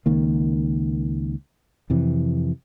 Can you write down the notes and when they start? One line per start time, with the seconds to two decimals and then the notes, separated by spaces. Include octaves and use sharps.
0.06 C#2 D#3 A#3
1.90 F2 C3 E3